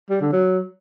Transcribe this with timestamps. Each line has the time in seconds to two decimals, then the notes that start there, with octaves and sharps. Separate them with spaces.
0.10 G3
0.21 D3
0.32 F#3